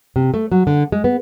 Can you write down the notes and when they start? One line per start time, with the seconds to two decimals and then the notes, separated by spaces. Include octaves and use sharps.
0.16 C3
0.34 A3
0.52 F#3
0.67 D3
0.92 G#3
1.04 B3